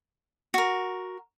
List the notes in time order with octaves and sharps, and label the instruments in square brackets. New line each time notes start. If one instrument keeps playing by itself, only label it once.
[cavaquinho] F#4 A#4